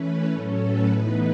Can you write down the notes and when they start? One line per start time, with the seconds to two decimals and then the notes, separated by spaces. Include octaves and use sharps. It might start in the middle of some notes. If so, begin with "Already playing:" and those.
Already playing: E3 A3 C#4 B4
0.32 A2 F#3 C#4 A4
0.60 B4
0.88 A2 E3 B3 D#4